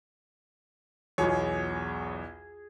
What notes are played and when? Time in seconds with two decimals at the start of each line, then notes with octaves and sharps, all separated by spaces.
1.18 B1 E2 F4 F#4 G#4 C#5 D6